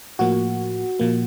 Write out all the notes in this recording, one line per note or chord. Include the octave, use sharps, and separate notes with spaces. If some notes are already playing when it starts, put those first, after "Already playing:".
A2 F3 A#3 F#4
A#2 F3 A#3